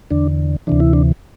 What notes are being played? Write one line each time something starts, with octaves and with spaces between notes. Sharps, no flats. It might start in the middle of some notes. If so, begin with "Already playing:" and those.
E2 D3 D4
D2 C3 E3 D4
E4
D4